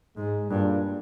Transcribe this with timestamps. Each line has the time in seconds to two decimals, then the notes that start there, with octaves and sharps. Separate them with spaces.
0.17 G#2 G#3
0.50 G2 A#2